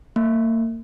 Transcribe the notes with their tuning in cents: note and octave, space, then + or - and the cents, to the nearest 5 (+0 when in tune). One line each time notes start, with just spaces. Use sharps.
A#3 -40